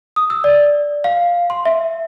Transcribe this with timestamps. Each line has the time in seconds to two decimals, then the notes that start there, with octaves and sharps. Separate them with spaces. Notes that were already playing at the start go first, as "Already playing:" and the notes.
0.16 D#6
0.30 E6
0.44 D5
1.04 F5
1.50 C6
1.65 E5